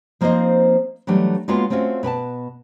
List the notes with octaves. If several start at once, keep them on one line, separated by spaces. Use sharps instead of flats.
F3 A#3 C4 D#4 C5 D#5
E3 F#3 G3 A3 D4
G#3 A#3 B3 C#4 F4 F#4
A3 C4 C#4 F4 F#4
B2 B4 G#5 A5